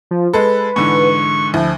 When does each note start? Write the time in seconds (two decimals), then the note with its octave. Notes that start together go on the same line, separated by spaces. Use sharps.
0.11 F3
0.33 G#3 A4 B4
0.76 G#2 D3 E3 C#6
1.54 D2 F3 E4